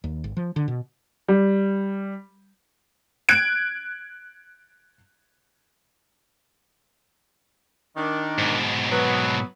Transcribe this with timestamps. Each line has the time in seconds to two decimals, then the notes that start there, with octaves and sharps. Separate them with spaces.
0.04 D#2
0.24 G#1
0.37 F3
0.56 D3
0.68 B2
1.28 G3
3.29 F#6 G#6 D7
7.96 D#3 D4
8.38 G#2 B2
8.91 F#3 B3